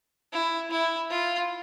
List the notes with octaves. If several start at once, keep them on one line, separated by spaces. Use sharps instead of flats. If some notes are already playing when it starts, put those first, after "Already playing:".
E4
E4
F4